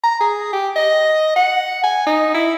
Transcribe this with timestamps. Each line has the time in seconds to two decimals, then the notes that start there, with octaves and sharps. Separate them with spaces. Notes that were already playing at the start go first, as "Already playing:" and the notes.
0.04 A#5
0.20 G#4
0.53 G4
0.76 D#5
1.36 F#5
1.83 G#5
2.07 D#4
2.34 E4